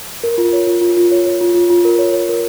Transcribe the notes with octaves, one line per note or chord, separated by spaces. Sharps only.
A#4
F4
C#5
F4
F4
F4
C#5
C#5
F4
F4
F4
A#4
C#5
C#5
A#4